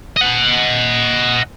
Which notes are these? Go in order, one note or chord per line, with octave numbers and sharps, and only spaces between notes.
D#5 F#5